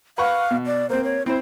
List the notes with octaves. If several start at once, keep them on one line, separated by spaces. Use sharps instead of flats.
B4 F5 F#5 C#6
B2
D5
A#3 C4 C5
C#5
C4 E4 C5